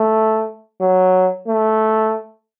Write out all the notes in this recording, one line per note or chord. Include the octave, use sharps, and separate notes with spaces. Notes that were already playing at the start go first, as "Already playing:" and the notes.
Already playing: A3
F#3
A3